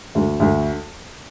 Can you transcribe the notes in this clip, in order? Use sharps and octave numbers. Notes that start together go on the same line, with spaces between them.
D2
D2